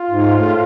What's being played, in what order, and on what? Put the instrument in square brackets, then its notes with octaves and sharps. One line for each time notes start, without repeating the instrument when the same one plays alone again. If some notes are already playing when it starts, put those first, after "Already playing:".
Already playing: [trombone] F4
[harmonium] G#2
A2